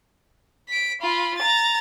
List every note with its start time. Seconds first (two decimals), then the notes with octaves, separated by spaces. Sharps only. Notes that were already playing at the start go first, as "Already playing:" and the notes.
0.69 B6 D7
1.01 F4 B5
1.38 A#5 A6